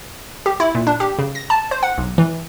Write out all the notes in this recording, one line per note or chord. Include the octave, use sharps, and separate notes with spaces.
G4
E4
A#2
D4
G4
C#3
A#6
A5
C5
F#5
B1
E3